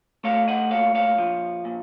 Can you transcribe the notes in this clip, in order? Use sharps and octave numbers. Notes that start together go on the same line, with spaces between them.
A3 C#5 F5
D#5 F#5
A#2 C#5 F5
C#5 F5
F3
A#2